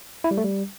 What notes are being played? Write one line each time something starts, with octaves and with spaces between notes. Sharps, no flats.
E4
G3
A3
G3